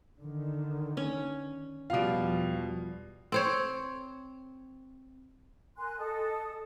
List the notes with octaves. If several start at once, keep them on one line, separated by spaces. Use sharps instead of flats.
D3 D#3
C#4
E2 B2 F3 G3 F4 F5
C4 C5 C#5
A#4 G#5 C6 F#6
A4 D#5 A5 D#6